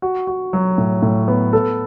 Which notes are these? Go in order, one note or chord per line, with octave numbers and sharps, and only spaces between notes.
F#4
F#4
F#3
A2
A2
B3
A4